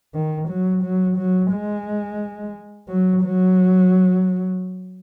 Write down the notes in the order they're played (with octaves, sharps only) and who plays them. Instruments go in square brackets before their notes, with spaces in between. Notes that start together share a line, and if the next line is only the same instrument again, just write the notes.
[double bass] D#3
F#3
F#3
F#3
G#3
F#3
F#3